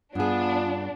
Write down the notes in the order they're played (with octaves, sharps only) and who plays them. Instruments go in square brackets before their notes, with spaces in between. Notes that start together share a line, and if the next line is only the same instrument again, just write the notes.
[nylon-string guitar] G2 G#4 [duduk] B3 [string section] D4 [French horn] F4